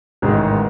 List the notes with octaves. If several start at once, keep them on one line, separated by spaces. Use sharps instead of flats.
A1 G#2 D#3 G#3